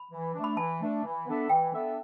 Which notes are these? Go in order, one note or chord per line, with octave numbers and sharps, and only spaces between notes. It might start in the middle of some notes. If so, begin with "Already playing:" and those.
Already playing: B5
E3
A3 D4
B5
E3 A5
A3 D4
E3
B3 D4 A4 E5
E3 G5
B3 D4 A4 E5